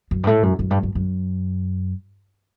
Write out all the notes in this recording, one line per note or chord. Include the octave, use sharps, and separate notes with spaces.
F#2
G2
A2
F#2
F#2
G2
F#2
F#2